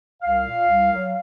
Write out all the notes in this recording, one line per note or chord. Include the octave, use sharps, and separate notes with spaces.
C2 F5
A#2
C2
F#3